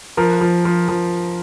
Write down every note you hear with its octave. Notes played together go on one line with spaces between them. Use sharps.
F3 A#4
F3
F3
F3